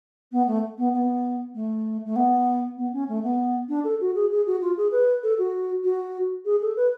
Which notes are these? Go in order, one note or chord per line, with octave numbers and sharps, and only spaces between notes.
B3
A3
B3
B3
A3
A3
B3
B3
C#4
A3
B3
D4
A4
F#4
G#4
G#4
F#4
F4
G#4
B4
A4
F#4
F#4
G#4
A4
B4